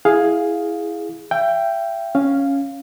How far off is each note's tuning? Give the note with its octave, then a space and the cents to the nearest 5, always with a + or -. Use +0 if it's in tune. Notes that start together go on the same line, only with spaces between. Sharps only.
E4 +0 G#4 +0 F5 +15
E5 +40 G5 +0
C#4 +0 F5 +0